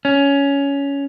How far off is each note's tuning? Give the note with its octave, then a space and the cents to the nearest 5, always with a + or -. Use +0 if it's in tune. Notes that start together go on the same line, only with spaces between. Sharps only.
C#4 +15